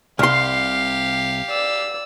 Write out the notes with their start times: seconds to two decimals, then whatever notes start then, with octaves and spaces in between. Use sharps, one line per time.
0.19 C2 G4 F5 C6 F6 C7
1.49 D5 E6